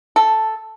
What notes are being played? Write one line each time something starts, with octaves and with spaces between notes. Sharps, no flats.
A4